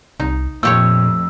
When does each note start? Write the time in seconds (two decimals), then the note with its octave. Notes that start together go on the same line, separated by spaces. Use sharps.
0.20 C2 D#4
0.63 F2 A#2 A3 G4 C#5 E6